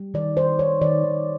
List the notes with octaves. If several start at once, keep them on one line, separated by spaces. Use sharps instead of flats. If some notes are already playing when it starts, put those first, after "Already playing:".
Already playing: G3
D#3 D5
D#3 C5
D#3 C#5
D#3 D5
D#3